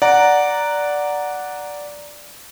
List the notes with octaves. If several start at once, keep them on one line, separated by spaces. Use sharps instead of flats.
D5 F#5 A#5